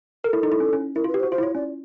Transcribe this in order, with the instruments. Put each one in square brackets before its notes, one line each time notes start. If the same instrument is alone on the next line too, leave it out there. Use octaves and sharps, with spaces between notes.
[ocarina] A4 [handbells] A#4
[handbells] E4
D#4
E4
C#4
C#4
[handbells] E4 [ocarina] A#4
[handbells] F4
[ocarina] B4
[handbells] G4
[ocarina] C5
[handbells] F#4
[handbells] F4 [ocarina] C5
[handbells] E4
[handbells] F4 [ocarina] C#5
[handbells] C#4 [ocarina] D5